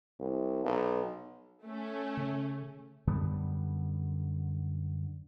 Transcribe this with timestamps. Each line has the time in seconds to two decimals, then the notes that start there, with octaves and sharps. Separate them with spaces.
0.20 C2
0.64 B1
1.64 A3 C#4
2.17 C#3
3.07 F#2 D3 G3 B3